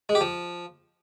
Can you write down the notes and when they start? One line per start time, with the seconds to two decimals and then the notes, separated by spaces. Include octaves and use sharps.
0.09 G#3
0.15 G4
0.21 F3